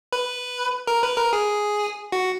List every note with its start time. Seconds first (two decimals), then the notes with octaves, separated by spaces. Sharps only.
0.13 B4
0.87 A#4
1.03 B4
1.17 A#4
1.33 G#4
2.12 F#4